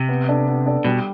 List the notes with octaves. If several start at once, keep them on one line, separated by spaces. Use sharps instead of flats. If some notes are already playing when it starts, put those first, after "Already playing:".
Already playing: C3
B3
D4 A4 D5
B3
D4 A4 D5
B2 G3